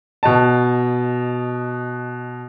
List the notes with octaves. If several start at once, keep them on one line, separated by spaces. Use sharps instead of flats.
B2 D#5 A5